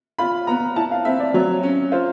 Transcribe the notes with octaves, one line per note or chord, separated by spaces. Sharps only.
F4 B5
B3 A#5
E4 A5
F5
C4 E5
D5
F#3 C#5
C#4
F4 C5